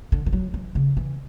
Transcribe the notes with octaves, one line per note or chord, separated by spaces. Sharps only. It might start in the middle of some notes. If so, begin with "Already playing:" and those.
D3
E3
F#3
E3
C#3
E3